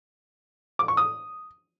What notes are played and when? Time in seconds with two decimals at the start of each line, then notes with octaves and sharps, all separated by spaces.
0.79 D6
0.88 C#6
0.97 D#6